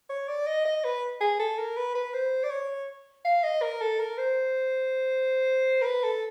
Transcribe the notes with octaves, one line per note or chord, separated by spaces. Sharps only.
C#5
D5
D#5
D#5
B4
G#4
A4
A#4
B4
B4
C5
D5
C#5
F5
D#5
A#4
A4
A#4
C5
A#4
B4
A4